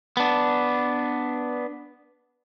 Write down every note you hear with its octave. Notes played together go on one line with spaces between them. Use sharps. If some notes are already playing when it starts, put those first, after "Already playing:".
B3 D4